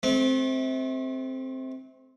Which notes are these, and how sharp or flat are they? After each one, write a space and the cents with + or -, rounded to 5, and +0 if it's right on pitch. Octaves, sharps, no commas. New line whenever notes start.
A3 -35 C4 +0